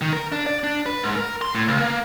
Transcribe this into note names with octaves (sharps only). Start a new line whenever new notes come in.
D#3
A#4
D4
D5
D4
B4
G#2
A#4
C6
A2
C#2
A#3